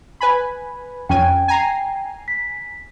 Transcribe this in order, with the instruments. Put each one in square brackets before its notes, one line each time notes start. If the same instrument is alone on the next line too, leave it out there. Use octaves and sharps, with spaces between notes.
[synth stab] B4 G#5 B5
[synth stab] F2 C#4 G#5 [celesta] G5
[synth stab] G#5 A#5 C7
[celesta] B6